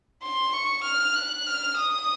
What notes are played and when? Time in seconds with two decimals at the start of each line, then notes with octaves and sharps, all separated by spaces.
0.23 C6
0.54 C#6
0.84 F6
1.16 F#6
1.46 F6
1.77 D#6